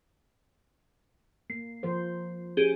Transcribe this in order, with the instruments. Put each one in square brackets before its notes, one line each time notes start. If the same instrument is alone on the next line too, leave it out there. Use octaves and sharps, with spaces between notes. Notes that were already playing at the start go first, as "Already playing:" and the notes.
[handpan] A#3 [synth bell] C7
[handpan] F3 A#4 C5
[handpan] C#4 [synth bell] G4 G#4 G7